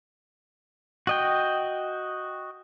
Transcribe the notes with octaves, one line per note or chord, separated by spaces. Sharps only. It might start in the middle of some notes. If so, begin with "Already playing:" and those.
F#4 D#5 G5